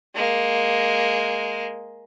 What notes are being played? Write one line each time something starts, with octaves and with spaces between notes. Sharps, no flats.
G#3 A#3